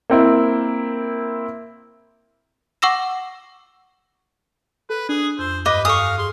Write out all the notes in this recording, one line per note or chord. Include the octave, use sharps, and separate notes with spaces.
A#3 C4 E4
F#5 C#6 D6 E6 A#6 E7
A4 B4
D4 G#4 D#6
F2 C5 E6
G2 B4 D#5 D6
A4 F5 G#5 C#6 D#6
G#4 C6